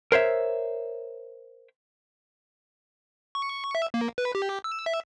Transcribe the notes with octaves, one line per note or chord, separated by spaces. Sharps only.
A#4 C5 C#5 E5
C#6
E5
A#3
B4
G4
E6
E5